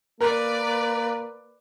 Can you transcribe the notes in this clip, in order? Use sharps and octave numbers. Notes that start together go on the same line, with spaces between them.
A#3 A#4 B4 D5